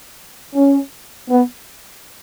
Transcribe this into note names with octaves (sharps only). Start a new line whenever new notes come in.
C#4
B3